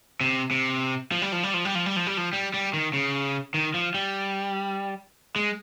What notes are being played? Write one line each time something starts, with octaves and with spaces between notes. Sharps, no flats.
C3
C3
F3
G3
F3
G3
F3
G3
F3
G3
F3
G3
F3
G3
G3
D#3
C#3
D#3
F3
G3
G#3